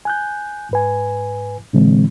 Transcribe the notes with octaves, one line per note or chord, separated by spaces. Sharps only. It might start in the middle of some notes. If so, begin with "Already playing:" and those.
G#5 F#6 G6
G#2 B4 G#5
A#2 D3 E3 G#3 C4